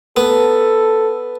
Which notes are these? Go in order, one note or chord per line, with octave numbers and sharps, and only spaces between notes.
B3 A4